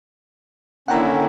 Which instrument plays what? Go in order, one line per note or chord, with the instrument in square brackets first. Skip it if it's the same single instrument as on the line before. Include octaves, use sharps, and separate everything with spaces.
[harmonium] D3 C#4 [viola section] D#3 A#3 E4 [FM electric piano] F#5 G5 A#5